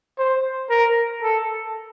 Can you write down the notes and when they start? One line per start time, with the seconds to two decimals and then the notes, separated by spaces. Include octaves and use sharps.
0.18 C5
0.70 A#4
1.23 A4